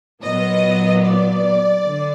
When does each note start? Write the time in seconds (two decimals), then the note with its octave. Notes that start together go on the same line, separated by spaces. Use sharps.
0.23 A#2 F#3 B3 D#5
1.03 D5
1.84 D3